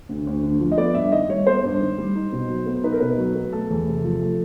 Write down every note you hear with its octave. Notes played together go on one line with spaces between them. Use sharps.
D2
D2
D3
F3
D#5
B3 D5
G2 E5
D#3 D#5
G3 C#5
B3 C5
G2
D#3
G3
D#4
B2
F#3
B3
D#4 B4
A#4
B2 B4
F#3
B3
A3 A4
E2
C3
F3
A3